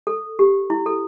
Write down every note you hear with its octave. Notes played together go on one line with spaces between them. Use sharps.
A4
G4
E4
A4